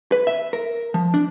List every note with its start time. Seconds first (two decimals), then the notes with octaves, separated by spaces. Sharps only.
0.12 B4
0.27 E5
0.53 A#4
0.94 F3
1.14 D4